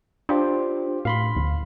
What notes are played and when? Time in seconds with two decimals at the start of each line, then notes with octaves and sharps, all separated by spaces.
0.29 D4 F4 G4 C5
1.05 A2 F5 B5 C6
1.36 D2